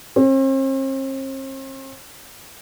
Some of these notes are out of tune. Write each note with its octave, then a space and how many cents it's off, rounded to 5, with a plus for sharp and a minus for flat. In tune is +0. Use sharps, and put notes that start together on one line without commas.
C4 +45